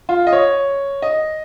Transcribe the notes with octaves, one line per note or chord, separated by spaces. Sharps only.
F4
D#5
C#5
D#5